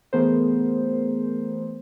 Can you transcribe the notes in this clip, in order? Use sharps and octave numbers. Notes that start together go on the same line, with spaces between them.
E3 A3 B3 G#4 A#4 C5